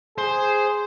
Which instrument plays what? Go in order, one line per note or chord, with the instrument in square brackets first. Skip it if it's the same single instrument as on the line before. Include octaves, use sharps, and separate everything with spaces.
[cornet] G#4 [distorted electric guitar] C5